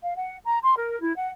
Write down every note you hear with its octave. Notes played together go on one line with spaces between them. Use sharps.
F5
F#5
A#5
C6
A#4
E4
F#5